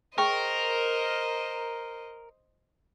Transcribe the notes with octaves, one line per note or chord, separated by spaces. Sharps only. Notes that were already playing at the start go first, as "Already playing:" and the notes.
G#4 A#4 C5 D#5 G5 C#6